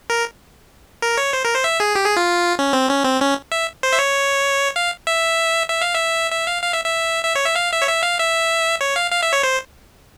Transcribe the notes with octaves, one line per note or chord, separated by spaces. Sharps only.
A#4
A#4
C#5
C5
A#4
C5
E5
G#4
G4
G#4
F4
C#4
C4
C#4
C4
C#4
E5
C5
E5
C#5
F5
E5
E5
F5
E5
E5
F5
F5
E5
E5
E5
C#5
E5
F5
E5
C#5
E5
F5
E5
C#5
F5
F5
E5
C#5
C5